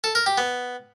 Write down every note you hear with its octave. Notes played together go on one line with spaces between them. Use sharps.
A4
A#4
G4
B3